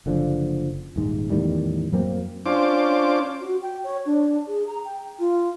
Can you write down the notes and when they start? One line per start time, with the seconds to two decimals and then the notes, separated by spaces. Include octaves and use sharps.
0.06 F#1 D3 F3
0.96 D#1 G#2
1.30 E2 A2 D#3 G3
1.93 F#2 F#3 A#3 C4
2.46 C#4 D4 F4 C5 D6
3.40 F#4
3.62 G5
3.84 C#5
4.06 D4
4.48 G#4
4.67 A#5
4.85 G5
5.19 F4